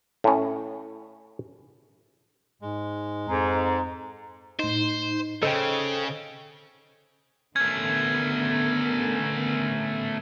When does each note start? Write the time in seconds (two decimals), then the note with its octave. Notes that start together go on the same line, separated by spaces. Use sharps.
0.24 A2 C#4
2.62 G#2 G#3
3.28 F2 G#2 A#5
4.59 A2 D#4 C5
5.43 C#3 A4 C5 D#5 G5
7.56 D3 A3 B3 C#4 A#4 G#6